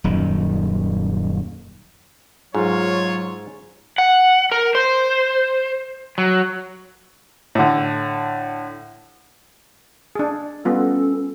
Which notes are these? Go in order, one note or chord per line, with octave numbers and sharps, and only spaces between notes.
D#1 F#2 D#3
G#2 F#3 F4 C#5
F#5
A#4
C5
F#3
A2 D3
D4 G#4
G3 B3 C#4 F4 A4